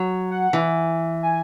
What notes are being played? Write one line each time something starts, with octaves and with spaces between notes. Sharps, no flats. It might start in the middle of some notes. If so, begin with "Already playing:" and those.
Already playing: F#3
F#5
E3
G#5